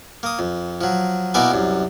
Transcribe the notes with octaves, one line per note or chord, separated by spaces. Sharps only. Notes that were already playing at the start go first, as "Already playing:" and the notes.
A#3 D#6
F2
F3 F#3
B2 A#3 B3 E4 D5 G#5
C2 F#2